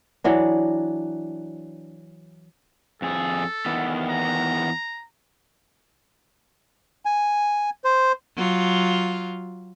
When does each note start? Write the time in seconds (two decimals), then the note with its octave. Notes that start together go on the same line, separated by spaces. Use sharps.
0.24 E3 F#3 D4
3.02 F2 G#4 A4
3.66 E2 D#3 B3
4.09 A#5
7.05 G#5
7.84 C5
8.37 F#3 F4